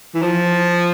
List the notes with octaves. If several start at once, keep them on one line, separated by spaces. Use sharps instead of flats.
E3
F3